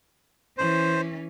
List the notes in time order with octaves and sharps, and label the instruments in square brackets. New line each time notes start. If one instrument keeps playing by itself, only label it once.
[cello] E3 C#4 [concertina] C5